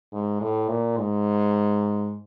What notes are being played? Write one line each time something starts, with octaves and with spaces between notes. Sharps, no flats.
G#2
A2
A#2
G#2